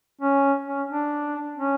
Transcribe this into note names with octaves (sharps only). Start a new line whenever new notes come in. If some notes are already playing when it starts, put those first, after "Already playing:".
C#4
C#4
D4
C#4